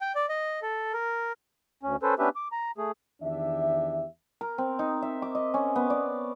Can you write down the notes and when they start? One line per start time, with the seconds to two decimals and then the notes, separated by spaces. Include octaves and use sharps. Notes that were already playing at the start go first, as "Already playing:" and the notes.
0.01 G5
0.15 D5
0.29 D#5
0.62 A4
0.93 A#4
1.83 D2 C#4
2.03 C#4 A4 B4 C5
2.19 B3 C#4 D4 G4 B4 E5
2.36 D6
2.52 A#5
2.78 A3 G#4
3.23 E2 D#3 D4 G4 E5
4.41 A#4
4.58 C4
4.79 D#4
5.02 E5
5.22 D6
5.35 D#5
5.54 C#4
5.76 B3
5.90 D5